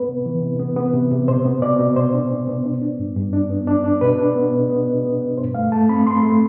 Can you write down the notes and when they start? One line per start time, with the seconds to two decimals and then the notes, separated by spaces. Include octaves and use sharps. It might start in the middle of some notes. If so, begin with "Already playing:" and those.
Already playing: B3 B4
0.09 C3
0.26 E3
0.42 C3
0.59 B3
0.76 B3
0.93 C3
1.11 C3
1.28 B2 C5
1.45 B3
1.62 B2 D5
1.79 B2
1.96 B2 C5
2.13 D4
2.31 B2
2.47 B3
2.65 D4
2.81 D4
2.99 G2
3.16 G2
3.33 D4
3.50 B3
3.67 D4
3.84 D4
4.01 B2 B4
4.18 D4
4.36 B3
4.52 B2
4.69 B3
4.87 B2
5.04 B3
5.21 B2
5.38 G2 C5
5.55 A3 F5
5.72 A3 A5
5.89 C4 B5
6.07 C4 C6
6.23 A3